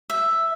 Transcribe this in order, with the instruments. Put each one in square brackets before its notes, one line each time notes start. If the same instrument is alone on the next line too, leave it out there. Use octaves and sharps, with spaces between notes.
[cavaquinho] E5